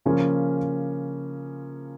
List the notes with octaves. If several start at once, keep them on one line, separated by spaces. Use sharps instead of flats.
C#3 F3 A#3 C#4 F4